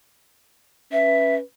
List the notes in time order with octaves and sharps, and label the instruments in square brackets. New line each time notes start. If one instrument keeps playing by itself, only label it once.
[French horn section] C#4 B4 [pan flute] E5